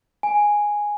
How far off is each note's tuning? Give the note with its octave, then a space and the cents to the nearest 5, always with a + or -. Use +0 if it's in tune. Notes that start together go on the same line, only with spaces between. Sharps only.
G#5 -5